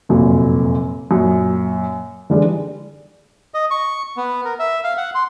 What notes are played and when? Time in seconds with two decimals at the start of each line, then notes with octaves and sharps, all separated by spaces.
0.09 F1 F#2 A#2 A#3
1.11 F#2 A#2
2.30 D3 E3 G3 G#3 D4
3.54 D#5
3.71 C#6
4.17 B3
4.45 A#4
4.59 E5
4.84 F5
4.97 F#5
5.15 C6